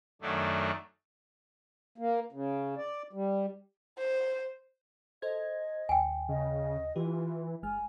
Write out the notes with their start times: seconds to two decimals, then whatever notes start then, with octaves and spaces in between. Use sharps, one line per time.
0.22 F#2 D#3 F#3 A3 D4
1.98 A#3
2.32 C#3
2.77 D5
3.13 G3
3.98 C5
5.22 A4 C5 D#5 G#6
5.89 D#2 G5 G#5
6.29 C#3 D#5
6.96 E3 F4 G4
7.63 G1 G#3 G#5 F6